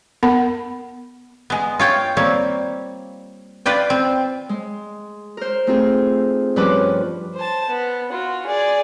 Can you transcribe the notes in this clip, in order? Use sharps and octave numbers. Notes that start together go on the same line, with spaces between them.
B3 A#4 F#5 B5
G#3 B3
F4 C#5 G5
G3 A#3 C4 C#5
F4 B4 D5 G5
C4
G#3
A#4 C5
A3 C4 D#4 F4 G#4
G2 F3 C#4 B4 B5 D6
C5 A5
B3
F4 F#4
G#4 D5